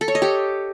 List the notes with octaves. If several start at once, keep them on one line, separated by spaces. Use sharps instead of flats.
A4
C#5
D#5
G4